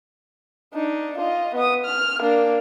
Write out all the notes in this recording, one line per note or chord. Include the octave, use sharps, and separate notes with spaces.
D4 D#4
F4 D#5
B3 D#6
F6
A#3 D4